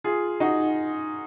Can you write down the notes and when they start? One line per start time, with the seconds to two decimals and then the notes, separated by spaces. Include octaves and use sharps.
0.04 F4 G#4
0.40 D#4 F#4